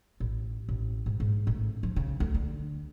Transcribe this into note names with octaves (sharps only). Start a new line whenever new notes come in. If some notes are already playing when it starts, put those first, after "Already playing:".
A1
A1
G#2
G#2
A1
F3
C#3
D2
D3